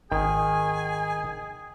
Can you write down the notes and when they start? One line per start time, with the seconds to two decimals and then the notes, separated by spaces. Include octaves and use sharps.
0.12 G#1 D#3 G#4 G#5